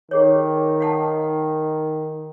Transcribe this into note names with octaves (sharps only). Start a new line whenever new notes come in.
D#3 G4 G#4 C#5
F5 F#5 A5